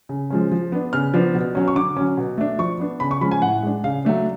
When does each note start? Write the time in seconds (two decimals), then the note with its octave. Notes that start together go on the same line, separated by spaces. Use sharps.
0.09 C#3
0.30 F3 G#3 C#4
0.52 F3
0.72 B3 D4
0.93 C#3 F6
1.14 F3 B3 D4
1.35 B2
1.55 F#3 C#4
1.68 C#6
1.75 D3 D6
1.96 F#3 C#4
2.17 B2
2.38 A3 D4
2.59 F3 C#6
2.80 B3 D4
3.00 C#3 B5
3.11 C#6
3.21 F3 G#3 C#4 B5
3.31 G#5
3.42 A2 F#5
3.63 G#3 D4
3.84 C#3 F5
4.05 F#3 A3 D4